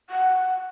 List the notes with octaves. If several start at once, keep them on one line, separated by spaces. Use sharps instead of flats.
F#5